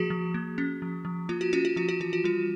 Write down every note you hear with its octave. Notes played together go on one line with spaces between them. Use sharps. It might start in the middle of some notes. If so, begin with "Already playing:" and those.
Already playing: F3 A#3 F#4 G#4
F3
A#3
C#4
F3
F3
A#3 F4
F#4
C#4 F4
F#4
F3 F4
F#4
E3 F4
F#4
G3 F4